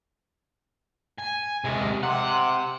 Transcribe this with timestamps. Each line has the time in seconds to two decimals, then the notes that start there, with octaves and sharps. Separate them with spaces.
1.18 G#5
1.64 C3 G#3
2.03 C3 F#5